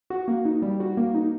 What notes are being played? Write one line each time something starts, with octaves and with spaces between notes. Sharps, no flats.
F#4
A#3
D#4
G3
F#4
A#3
D#4